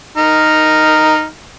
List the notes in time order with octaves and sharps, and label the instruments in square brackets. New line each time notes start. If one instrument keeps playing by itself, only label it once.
[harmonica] D#4 F6